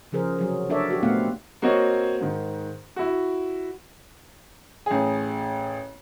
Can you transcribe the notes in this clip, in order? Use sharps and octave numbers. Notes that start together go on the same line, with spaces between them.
C#3 F3 G#4 A#4 C5
C3 F#3 G#4
D4 A4 A#4 C#5 D5 E5
F#4 G4
A#2 A3 B3 C4 F5 F#5
A#3 C4 F#4 C#5 D#5
G#2 D#3
E4 F#4
A1 G#4